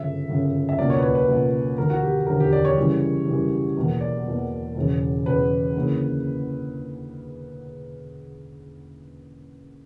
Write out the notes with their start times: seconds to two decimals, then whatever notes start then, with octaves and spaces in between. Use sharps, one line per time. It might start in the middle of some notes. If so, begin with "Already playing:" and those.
Already playing: G1 F#2 C#3 E5
0.28 G1 F#2 C#3
0.69 E5
0.78 C#2 B2 F#3 A#3 D5
0.90 C#5
0.98 B4
1.03 C#5
1.15 B4
1.28 C#2 B2 F#3 A#3
1.77 E1 D2 D3 F#3 A#4
1.90 F#4
2.03 G4
2.27 E1 D2 D3 F#3 A#4
2.40 G4
2.53 D5
2.65 C#5
2.77 F#2 C#3 E3 G3
3.27 F#2 C#3 E3 G3
3.77 E1 E2 B2 A#3
4.01 D5
4.26 E1 E2 B2 A#3
4.75 E1 E2 C#3
5.25 E1 E2 C#3 B4
5.75 D2 C#3 E3 A#3